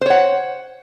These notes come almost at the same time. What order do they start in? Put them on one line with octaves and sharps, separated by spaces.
C5 C#5 F#5